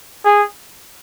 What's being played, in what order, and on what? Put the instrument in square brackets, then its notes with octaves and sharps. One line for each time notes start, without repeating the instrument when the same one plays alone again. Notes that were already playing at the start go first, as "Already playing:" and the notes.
[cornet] G#4